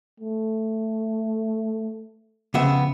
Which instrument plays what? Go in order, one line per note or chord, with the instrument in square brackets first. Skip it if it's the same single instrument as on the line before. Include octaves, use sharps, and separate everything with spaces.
[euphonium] A3
[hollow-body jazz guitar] F2 B3 E5 [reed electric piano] C#3